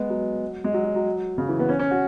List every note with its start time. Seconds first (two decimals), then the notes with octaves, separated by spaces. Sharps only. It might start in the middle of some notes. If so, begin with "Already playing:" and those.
Already playing: G#3 B3
0.10 F#3
0.64 G#3
0.74 F#3
0.84 F#3
0.95 F#3
1.38 C#3
1.48 E3
1.59 B3
1.69 C#4
1.79 C#4
1.91 F#4